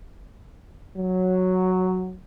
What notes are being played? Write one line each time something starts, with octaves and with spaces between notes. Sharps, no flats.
F#3